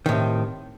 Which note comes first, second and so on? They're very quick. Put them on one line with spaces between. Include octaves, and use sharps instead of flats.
D#3 A2 C3